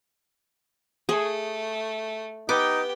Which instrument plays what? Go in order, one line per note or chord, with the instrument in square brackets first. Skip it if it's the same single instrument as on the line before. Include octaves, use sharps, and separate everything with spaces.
[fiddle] A3 [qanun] G#4
[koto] B3 [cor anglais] D#4 [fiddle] G4 [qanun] D6